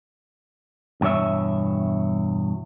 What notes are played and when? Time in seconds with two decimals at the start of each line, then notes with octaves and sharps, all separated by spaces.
1.01 E2 G2 B2 C#5 E5